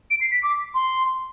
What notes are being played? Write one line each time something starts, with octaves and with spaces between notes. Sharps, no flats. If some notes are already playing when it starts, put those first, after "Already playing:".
D7
C7
B6
D6
C6